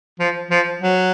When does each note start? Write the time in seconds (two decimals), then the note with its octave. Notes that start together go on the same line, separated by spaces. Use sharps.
0.19 F3
0.51 F3
0.82 F#3